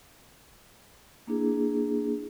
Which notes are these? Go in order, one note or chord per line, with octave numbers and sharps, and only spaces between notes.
A#3 D4 E4 G#4